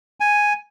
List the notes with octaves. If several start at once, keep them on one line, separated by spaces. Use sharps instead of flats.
G#5